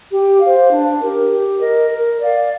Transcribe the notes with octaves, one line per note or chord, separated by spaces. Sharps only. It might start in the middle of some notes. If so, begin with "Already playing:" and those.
G4
C5 F5
D4
G4 A#4
G4
A#4 D#5
A#4
D5 F5